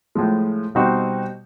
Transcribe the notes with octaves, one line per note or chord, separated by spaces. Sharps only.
A2 F3 G#3
B2 G3 C4 D#4 F#4